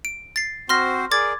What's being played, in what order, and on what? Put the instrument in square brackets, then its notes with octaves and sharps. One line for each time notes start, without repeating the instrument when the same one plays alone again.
[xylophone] D7
A6 C7
[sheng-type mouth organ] C4 F#4 C5 [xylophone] C6 F6 A#6
[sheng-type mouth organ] G#4 A#4 D5 [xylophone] D6 G#6 A6